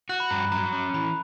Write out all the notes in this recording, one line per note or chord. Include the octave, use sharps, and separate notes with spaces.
F#4 F#6
B5
G2 A#5
B5
F#3 A#5
C#4
E3 B5